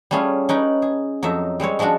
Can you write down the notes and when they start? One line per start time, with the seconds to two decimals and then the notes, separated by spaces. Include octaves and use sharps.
0.11 G3 A3 C#4 F4 G#4
0.49 C#4 D#4 B4 G5
0.82 G#4
1.23 F2 F#3 D#4 E5
1.60 G3 G#3 C4 C#5
1.79 F3 G#3 C#4 D4 F#4